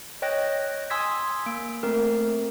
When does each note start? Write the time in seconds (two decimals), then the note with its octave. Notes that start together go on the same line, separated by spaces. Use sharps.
0.22 C#5 D#5 G5 F#6 A#6
0.90 G#5 C6 D#6 E6 G#6 B6
1.46 A#3 D7
1.83 A3 C4 A#4